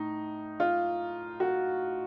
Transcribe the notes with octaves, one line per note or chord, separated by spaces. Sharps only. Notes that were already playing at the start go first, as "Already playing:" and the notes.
Already playing: A2 D#4
F4
F#4